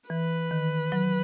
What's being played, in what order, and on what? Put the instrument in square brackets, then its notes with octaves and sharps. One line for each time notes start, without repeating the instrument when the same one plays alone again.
[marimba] E3 [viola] B4
[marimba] D#3
F#3